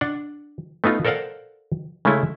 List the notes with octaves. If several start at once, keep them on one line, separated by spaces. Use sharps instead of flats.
D4 F#5
A3 B3 D#4 F4
A4 A#4 C5 D5 F5 F#5
C#3 G#3 A3 C#4 E4